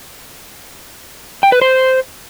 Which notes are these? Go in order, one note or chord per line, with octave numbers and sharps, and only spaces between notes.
G5
B4
C5